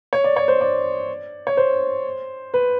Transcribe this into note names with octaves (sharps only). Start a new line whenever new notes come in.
C#5
D5
C#5
C5
D5
C#5
C5
B4